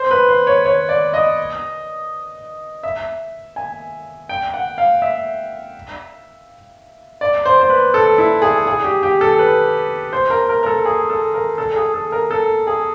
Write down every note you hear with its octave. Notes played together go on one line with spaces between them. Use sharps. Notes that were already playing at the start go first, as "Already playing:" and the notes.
Already playing: C5
B4
C5
C#5
C#5
D5
D#5
E5
G#5
G5
F#5
F5
E5
D5
C5
C5
B4
A4
E4
G#4
G#4
G4
G4
A4
B4
C5
A#4
A#4
A#4
A4
G#4
A4
A#4
A4
G#4
A4
A#4
A4
G#4